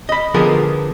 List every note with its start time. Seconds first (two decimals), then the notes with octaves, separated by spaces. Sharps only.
0.09 D#5 B5
0.34 D3 F3 B3 F4 G#4 A#4